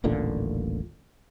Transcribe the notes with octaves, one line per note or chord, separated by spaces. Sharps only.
D#1 A1 A#2 D3